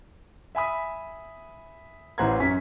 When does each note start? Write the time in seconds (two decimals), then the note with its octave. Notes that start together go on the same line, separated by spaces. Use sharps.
0.55 E5 G#5 B5 D#6
2.18 A1 E3 C5 F#5 A#5 G#6
2.40 F#2 C#4 B6